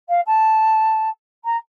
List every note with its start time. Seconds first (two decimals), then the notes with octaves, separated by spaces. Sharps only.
0.09 F5
0.26 A5
1.44 A#5